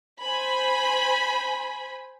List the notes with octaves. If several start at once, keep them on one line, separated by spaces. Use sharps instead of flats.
C5 G#5 B5